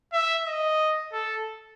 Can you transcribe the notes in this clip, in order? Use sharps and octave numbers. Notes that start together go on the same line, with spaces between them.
E5
D#5
A4